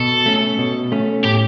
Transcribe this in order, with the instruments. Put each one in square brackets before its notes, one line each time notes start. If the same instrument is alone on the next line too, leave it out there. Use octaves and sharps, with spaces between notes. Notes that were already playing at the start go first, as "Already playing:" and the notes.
Already playing: [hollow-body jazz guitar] B2 [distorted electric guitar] A4
[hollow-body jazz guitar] A3 C#4
B2
A3 C#4
[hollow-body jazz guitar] A2 [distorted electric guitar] G4